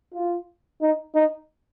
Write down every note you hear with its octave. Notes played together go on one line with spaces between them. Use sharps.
F4
D#4
D#4